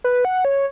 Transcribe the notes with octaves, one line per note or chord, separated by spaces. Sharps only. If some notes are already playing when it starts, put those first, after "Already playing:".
B4
F#5
C#5